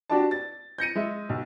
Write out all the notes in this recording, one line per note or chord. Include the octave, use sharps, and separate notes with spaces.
D4 F#4 G4 D5 A5
A6
G6 A#6 C#7 D#7
G#3 E5
B1